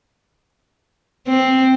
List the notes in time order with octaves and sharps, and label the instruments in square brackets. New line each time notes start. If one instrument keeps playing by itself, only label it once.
[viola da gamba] C4